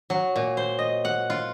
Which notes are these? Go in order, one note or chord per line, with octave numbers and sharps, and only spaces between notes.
F#3
A#2
C5
D#5
F#5
F4